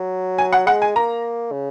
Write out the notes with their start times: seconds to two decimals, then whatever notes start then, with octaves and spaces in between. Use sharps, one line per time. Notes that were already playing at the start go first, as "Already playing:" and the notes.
Already playing: F#3
0.38 G#5
0.52 F#5
0.67 G#3 F#5
0.82 G#5
0.95 A#3 A#5
1.52 C#3